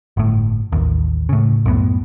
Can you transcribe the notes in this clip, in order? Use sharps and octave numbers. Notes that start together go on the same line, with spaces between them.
G1 A2
A1 D#2
A2 C#3
C2 F#2 A2 B3